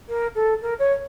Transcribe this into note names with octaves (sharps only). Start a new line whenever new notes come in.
A#4
A4
A#4
C#5